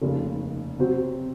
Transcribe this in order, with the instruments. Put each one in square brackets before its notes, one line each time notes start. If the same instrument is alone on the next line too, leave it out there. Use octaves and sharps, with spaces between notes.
[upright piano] F1 D#2 C#3
C3 F#3 C4 F#4 C5